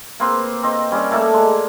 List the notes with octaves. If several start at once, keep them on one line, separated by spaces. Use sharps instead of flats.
A#3 C4 B4 C5
C4 D#5
G3 C#4
A3 A#3 A4 D5
G#3